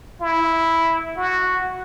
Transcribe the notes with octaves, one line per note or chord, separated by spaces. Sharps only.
E4
F#4